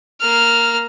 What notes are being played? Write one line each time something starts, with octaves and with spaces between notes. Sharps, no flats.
A#3 F6